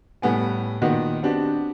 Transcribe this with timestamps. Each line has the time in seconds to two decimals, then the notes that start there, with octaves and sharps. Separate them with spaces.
0.22 A2 G3 B3 G#5
0.81 A#2 D#3 B3 F#4
1.23 B3 C4 D4 F#4 G4